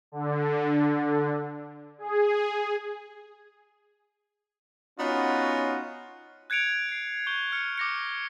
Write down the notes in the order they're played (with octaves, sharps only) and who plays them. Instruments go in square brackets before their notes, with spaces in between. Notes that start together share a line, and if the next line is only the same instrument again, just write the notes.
[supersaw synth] D3
G#4
[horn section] B3 C#4 D#4 F4 F#4
[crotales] F#6 G#6 C#7 D7 F7
C7 D7
C#6 G6 G7
F6 C#7
D6 A#6 C#7